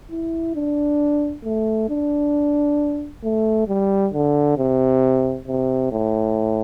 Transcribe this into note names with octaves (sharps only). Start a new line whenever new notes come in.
E4
D4
A3
D4
A3
G3
D3
C3
C3
A2